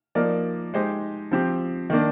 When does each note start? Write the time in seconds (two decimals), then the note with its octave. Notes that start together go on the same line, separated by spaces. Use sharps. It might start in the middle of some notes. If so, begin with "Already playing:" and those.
0.15 F3 A#3 D#4 A#4 D5
0.74 G#3 D#4 G4 C5
1.31 F3 C4 G4
1.90 D#3 A#3 D4